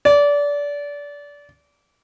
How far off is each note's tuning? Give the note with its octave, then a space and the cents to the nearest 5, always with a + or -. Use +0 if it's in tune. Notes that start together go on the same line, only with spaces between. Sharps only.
D5 -25